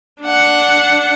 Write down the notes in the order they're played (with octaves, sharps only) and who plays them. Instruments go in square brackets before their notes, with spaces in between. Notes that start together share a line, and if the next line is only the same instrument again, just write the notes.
[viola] D4 F#5